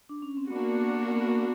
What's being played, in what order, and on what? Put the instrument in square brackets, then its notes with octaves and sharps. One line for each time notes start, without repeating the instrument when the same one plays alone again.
[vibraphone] D4
C#4
C4
[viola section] A#3 D4 F#4 [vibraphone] B3
[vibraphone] B3